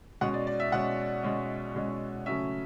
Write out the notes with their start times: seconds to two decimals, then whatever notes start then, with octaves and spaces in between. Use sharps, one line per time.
0.21 B2 G#3 C#4 F#5
0.34 D5
0.47 D5
0.60 E5
0.72 B2 G#3 C#4 F#5
1.23 B2 G#3 C#4
1.75 B2 G#3 C#4
2.26 C#3 F#3 A3 C#4 E5